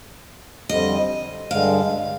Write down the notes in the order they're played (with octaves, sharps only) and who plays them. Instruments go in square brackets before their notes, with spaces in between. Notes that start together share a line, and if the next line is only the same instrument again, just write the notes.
[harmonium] F2 D3 G3 C4 [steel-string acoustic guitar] D#5
[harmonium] G2 D3 G#3 [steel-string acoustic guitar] F5